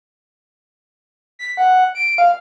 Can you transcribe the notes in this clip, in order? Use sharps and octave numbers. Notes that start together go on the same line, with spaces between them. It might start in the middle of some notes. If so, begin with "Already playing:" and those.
B6
F#5
D7
F5